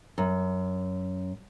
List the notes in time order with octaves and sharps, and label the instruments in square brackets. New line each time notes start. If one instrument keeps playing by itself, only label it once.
[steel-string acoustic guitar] F#2